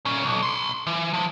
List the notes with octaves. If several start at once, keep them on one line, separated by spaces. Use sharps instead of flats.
A#2 C#4
B1
B5 C6
E3
F3